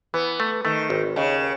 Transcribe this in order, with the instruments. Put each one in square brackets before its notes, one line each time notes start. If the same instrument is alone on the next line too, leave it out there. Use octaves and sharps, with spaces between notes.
[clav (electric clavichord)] E3 [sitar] B3
[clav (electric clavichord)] A3
[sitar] D#3 [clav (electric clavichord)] A3
[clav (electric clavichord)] G#1
[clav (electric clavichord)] D#2 [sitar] C#3